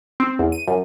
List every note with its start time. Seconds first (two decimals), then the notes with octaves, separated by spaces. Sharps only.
0.20 C4
0.39 E2
0.52 D#7
0.68 F#2